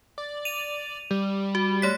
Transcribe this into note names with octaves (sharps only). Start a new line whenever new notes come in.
D5
D#7 F7
G3
F#4
A3 C#5 B6